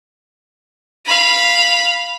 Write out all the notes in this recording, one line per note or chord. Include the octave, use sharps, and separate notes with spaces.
F5 B5